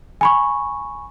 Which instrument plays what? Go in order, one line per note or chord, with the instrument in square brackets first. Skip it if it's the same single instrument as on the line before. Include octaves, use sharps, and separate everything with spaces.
[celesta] G#5 B5 C#6